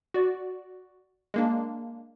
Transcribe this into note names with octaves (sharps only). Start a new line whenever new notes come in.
F#4 D5
G#3 A#3 D4